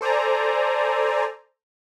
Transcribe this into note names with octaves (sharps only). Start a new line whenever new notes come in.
A4 C5 D5 G#5 A#5